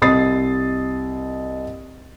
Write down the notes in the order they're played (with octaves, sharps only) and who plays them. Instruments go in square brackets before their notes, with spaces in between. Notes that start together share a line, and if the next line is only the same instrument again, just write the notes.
[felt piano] C2 D#5 D#6 A6 C7